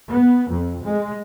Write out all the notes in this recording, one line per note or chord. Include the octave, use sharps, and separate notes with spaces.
B3
F2
G#3